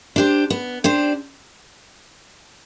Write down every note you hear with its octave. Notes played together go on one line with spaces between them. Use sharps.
D4 G4 C5
B3
D4 G4 C5